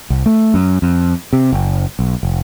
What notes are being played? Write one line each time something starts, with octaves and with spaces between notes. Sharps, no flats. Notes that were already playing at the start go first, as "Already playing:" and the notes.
C2
A3
F#2
F2
C3
F#1
B1
F1